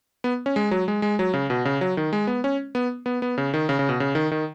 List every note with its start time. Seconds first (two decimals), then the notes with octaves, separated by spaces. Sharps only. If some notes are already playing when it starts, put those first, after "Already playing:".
0.24 B3
0.46 C#4
0.56 G#3
0.71 F#3
0.88 G#3
1.02 G#3
1.19 F#3
1.34 C#3
1.50 B2
1.65 C#3
1.81 F#3
1.97 D#3
2.13 G#3
2.27 B3
2.44 C#4
2.75 B3
3.06 B3
3.22 B3
3.38 C#3
3.54 D#3
3.69 C#3
3.79 C#3
3.89 B2
4.00 C#3
4.15 D#3
4.31 D#3